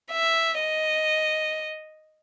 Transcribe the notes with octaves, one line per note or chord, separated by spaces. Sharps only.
E5
D#5